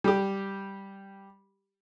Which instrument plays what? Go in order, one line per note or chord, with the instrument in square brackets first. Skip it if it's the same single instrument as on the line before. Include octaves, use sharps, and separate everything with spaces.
[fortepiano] G3 G4